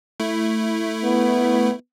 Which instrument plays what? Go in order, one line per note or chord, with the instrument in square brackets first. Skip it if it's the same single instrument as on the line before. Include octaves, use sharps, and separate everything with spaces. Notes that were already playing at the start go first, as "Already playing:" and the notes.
[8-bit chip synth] A3 E4
[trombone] B3